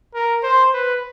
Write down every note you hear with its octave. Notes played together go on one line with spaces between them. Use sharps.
A#4
C5
B4